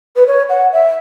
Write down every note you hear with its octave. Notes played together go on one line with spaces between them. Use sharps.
B4
C#5
F#5
E5